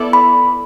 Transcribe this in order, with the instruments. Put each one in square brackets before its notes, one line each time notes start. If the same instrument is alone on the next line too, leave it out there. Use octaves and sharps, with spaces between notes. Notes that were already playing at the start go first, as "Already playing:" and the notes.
Already playing: [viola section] B3 E4 A4 D5
[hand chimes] B5